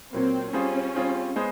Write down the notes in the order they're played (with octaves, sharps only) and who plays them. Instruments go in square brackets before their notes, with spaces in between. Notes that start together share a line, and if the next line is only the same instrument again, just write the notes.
[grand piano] A#2 F#3 A#3 [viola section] C4
[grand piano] G3 C4 F4 G#4 C5 [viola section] C#4
[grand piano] G3 C4 F4 G#4 C5
G#3 B3 G#4 C5